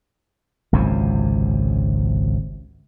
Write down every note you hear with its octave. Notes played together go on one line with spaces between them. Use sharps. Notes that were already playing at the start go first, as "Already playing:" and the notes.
G#1 C#2 F#2 C3